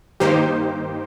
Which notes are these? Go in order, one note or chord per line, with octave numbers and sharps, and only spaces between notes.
G2 D#3 A#3 D#4 G4 C5